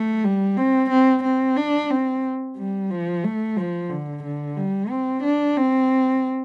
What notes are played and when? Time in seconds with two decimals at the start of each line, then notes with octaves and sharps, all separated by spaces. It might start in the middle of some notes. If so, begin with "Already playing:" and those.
Already playing: A3
0.24 G3
0.57 C4
0.90 C4
1.24 C4
1.57 D4
1.90 C4
2.57 G3
2.90 F3
3.24 A3
3.57 F3
3.90 D3
4.23 D3
4.57 G3
4.90 C4
5.23 D4
5.57 C4